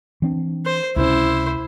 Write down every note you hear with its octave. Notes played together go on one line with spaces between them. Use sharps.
E3 C4 D4
C5
C#2 C3 C#4 E4 C5